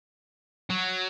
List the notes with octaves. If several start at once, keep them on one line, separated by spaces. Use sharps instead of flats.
F#3